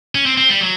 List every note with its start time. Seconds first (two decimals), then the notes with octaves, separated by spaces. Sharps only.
0.15 C#4
0.26 C4
0.37 C4
0.49 G3
0.61 F#3